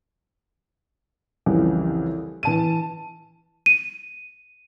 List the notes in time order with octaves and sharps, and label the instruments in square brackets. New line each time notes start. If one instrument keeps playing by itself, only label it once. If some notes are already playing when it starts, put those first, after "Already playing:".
[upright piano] C2 F2 C#3 E3
E3 A5 D#7
[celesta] D#7